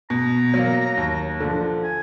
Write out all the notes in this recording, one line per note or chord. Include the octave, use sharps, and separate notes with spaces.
B2 A#5
F#3 A#3
D#2
D3 F3
G#5